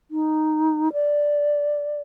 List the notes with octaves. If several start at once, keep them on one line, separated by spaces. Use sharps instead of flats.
D#4
D5